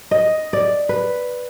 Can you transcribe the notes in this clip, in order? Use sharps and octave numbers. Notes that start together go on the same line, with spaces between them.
D#5
D5
B4